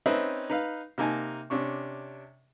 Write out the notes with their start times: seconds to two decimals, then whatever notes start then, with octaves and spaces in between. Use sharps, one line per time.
0.06 C4 C#4 D#4 B4 D#5 E5
0.50 D#4 B4 F5
0.98 C3 A#3 D#4 G#5 A5
1.50 C3 C#4 D4 C#6